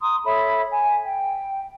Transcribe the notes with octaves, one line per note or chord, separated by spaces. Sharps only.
A#5 C6 D#6
A4 C#5 E5 B5
G#5
G5